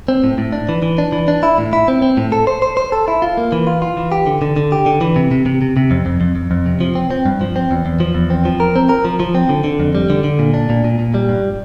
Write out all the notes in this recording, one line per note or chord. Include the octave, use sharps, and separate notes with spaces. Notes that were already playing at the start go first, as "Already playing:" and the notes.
C4
A2
A2
D4
E3
E3
D4
E3
D4
E4
A2
E4
C4
C4
A2
A4
C5
C5
C5
A4
E4
F4
A#3
E3
F4
F4
E3
G4
D3
D3
D3
G4
D3
E3
C3
C3
C3
C3
C3
F2
F2
F2
F2
F2
C3
F3
C4
C4
G2
F3
C4
E2
E2
F3
E2
C4
F3
A#4
C4
A#4
F3
F3
C4
D3
D3
F2
G3
D3
D3
A#2
D4
A#2
A#2
A#2
G3
G2